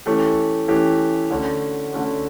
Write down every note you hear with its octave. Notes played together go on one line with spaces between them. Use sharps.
E3 A3 C#4 G4
E3 A3 C#4 G4
D3 A3 C#4 F#4
D3 A3 C#4 F#4